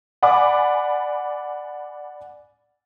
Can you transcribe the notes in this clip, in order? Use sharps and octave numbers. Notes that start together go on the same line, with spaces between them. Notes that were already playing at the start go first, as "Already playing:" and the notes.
D5 F#5 G#5 B5 D6